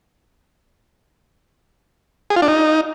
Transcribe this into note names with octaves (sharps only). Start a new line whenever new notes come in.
G#4
F4
D4
D#4